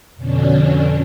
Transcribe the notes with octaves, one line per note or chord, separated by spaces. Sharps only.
F2 B2 D3 C#4 D4